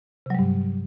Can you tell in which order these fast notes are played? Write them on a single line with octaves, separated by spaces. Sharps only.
C3 F#3 G3 G2